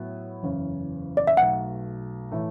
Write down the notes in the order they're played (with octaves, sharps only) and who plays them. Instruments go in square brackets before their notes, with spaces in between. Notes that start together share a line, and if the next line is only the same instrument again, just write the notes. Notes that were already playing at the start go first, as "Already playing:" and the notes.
Already playing: [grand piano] A2 F#3 B3 E4
F#1 E2 C#3
[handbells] D5
E5
[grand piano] B1 B2 A3 [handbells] F#5
[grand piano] A2 E3 A3